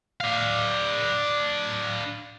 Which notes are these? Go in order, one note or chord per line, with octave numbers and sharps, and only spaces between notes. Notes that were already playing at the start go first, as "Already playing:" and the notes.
D4 F5